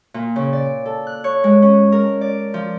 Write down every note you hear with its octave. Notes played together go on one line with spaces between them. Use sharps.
A#2
C#3
D5
A4
F#6
C#5
G#3
C#4
A#4
D5
F3